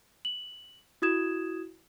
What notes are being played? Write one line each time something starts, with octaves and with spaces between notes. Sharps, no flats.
F#7
E4 F#4 D#6 G#6 E7